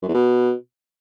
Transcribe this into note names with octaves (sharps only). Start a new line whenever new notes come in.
F#2
E2
B2